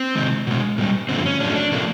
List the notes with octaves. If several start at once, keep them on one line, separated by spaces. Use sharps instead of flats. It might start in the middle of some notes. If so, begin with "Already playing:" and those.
Already playing: C4
C3 D#3 G#3
B2 G#3
A#2 G3
G2 D3 F3 A3 C4
C#4
A#2 F#3 A3 D4
D4
C3 F3 A3 A#3